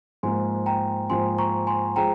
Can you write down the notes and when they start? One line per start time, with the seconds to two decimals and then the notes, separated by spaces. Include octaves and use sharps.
0.23 G#2 F3 A#3 G#5 C6
0.66 G5 A#5
1.10 G#2 F3 A#3 G#5 C6
1.38 A#5 C#6
1.67 G#5 C6
1.96 F3 G#3 G5 A#5